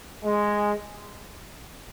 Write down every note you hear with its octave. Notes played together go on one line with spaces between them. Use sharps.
G#3